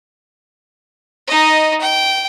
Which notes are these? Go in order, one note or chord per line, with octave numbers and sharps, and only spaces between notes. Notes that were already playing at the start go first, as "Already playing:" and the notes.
D#4 D#5
G5